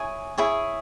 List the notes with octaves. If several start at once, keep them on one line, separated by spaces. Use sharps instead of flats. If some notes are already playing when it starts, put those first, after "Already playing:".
Already playing: E4 G#4 C#5 G#5
E4 G#4 C#5 G#5